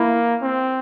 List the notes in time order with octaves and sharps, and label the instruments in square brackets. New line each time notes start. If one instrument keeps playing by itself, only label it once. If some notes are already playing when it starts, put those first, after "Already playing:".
Already playing: [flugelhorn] A#3 [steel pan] E4
[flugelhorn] C4